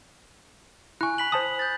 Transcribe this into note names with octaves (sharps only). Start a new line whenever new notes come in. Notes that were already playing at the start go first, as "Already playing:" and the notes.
E4 G#5 C#6 F#6
B5 B6 F#7
C5 A5 D#6
G6 A6